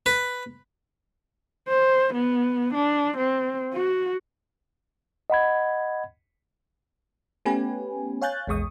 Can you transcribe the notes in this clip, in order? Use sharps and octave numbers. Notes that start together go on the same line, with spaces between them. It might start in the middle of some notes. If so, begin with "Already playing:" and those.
B4
C5
B3
D4
C4
F#4
D#5 F#5 B5 G#6
A3 B3 C#4 G4 B4 G#5
C#5 F5 G#5 F#6 G6 A6
A#1 E2 G#3 C#6 D#6